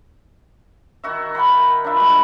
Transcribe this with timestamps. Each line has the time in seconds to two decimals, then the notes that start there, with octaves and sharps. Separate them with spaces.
1.03 D#3 F#4 E5
1.35 A#4 F#5 G5 B5
1.84 D4 F4 E5 B5
1.97 G3 G#3 F#4 B4